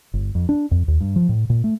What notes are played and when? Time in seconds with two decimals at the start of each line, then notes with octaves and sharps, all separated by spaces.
0.14 G1
0.35 F2
0.49 D4
0.71 F2
0.88 D#2
1.01 G2
1.16 F3
1.29 A2
1.50 A#2
1.64 A3